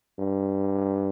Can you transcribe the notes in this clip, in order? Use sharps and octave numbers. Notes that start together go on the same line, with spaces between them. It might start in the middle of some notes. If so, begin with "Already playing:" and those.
G2